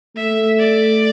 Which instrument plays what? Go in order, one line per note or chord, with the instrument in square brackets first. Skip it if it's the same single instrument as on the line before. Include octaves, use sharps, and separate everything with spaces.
[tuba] A3 [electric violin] E5
[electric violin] D5